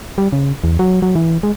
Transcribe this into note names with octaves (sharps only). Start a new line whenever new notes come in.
G3
C#3
E2
F#3
F#3
E3
G#3